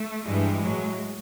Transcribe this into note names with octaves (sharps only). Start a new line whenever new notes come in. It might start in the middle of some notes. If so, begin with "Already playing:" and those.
Already playing: A3
G2 E3 G3 G#3
A2 F#3